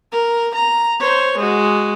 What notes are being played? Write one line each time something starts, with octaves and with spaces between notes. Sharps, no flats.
A#4
A#5
C5 C#5
G#3 F#4